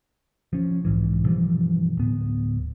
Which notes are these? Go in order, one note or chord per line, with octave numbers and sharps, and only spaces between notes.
F3 C#4
B1 G#2 E3
G2 B2 E3 F3
D1 B3